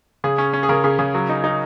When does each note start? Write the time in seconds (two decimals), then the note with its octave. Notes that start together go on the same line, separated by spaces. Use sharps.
0.24 C#3 G#4
0.38 C#4
0.53 C#4
0.63 G#4
0.69 C#3 A#4
0.84 C#3
0.99 C#3
1.14 F#3
1.29 D#4
1.44 D#4